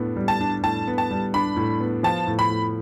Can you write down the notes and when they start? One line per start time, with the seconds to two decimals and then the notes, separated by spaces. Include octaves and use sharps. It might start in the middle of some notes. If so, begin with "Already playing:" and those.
Already playing: A2 B3 D4
0.16 G3
0.28 A5
0.41 D4
0.63 A2 A5
0.87 B3
0.98 A5
1.11 G3
1.34 D4 B5
1.56 A2
1.80 B3
2.03 F3 A5
2.27 A2
2.39 B5
2.50 A2